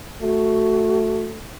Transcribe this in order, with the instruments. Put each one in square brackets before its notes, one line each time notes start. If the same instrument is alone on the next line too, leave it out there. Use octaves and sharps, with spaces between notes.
[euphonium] A3 [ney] F#4